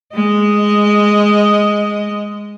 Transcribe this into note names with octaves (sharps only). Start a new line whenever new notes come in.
G#3 D#5